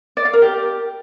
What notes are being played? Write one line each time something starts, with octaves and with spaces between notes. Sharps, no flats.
D5
F5
A#4
G4